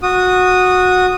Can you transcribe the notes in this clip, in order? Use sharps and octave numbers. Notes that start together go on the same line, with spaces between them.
F#4 D#6